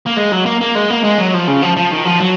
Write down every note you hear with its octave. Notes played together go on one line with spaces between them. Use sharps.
A#3
G#3
F#3
A#3
A#3
G#3
A#3
G#3
F#3
F3
C#3
F3
F3
D#3
F3
F#3